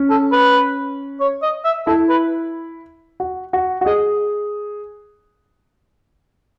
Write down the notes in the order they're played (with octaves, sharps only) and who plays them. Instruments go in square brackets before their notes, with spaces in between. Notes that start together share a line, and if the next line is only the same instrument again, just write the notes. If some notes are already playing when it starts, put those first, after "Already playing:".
Already playing: [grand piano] C#4
[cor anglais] A4
B4
C#5
D#5
E5
[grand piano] E4 [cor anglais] A4
[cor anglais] B4
[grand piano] F#4
F#4
F#4
[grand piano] G#4 [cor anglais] D#5